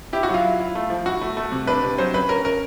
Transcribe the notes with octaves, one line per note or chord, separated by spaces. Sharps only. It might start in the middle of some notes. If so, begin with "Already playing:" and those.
E4 G4
F#4
F#3 F4
E4
E4
A3
F3
E4 F#4
A3
A3
C3
D4 B4
C3
F#3 C5
C#4 B4
C#4 A#4
C#4 A#4